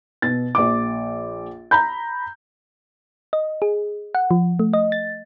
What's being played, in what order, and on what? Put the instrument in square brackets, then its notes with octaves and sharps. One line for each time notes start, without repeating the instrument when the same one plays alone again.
[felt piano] B2 A6
A#1 D6
A#5 B5 G6
[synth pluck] D#5
G#4
F#5
F3
A3
D#5
A6